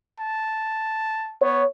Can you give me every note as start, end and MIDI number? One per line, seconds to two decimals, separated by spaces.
0.20 1.35 81
1.42 1.64 59
1.42 1.63 73